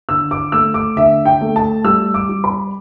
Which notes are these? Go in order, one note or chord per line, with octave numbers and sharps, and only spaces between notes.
D3 E6
D6
A3 E6
D6
D3 E5
G5
A3
A5
G3 E6
D6
G3
B5